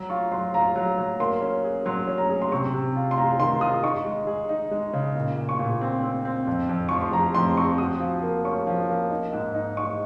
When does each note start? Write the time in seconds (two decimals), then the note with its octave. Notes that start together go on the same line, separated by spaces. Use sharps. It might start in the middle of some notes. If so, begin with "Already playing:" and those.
Already playing: F#3 A#5
0.10 F4 C#6
0.32 F#3 C6
0.54 F4 A#5
0.76 F#3
0.98 F#3
1.20 A#3 C6
1.42 C#4
1.64 G#4
1.86 F#3 C6
2.07 C#4
2.18 A#5
2.29 G#4
2.42 C6
2.51 C3 C#6
2.74 C3
2.96 F4
3.11 C6
3.17 F4 A#5
3.39 D#3 C6
3.61 F4 D#6
3.83 D#4 C#6
4.05 G#3
4.27 G#4
4.49 D#4
4.71 G#3
4.93 C#3
5.15 A#2
5.37 A#2
5.49 C#6
5.59 A#2
5.81 C4
6.03 C4
6.25 C4
6.47 F2
6.69 F2
6.89 F3 C#6
7.01 C6
7.13 F3 A#5
7.35 F2 C6
7.57 C4 C#6
7.78 F#4 D#6
8.00 F3
8.22 A#3
8.45 C#4 C#6
8.67 F3
8.89 A#3
9.10 D#4
9.32 G#2
9.54 D#4
9.77 D#4 C#6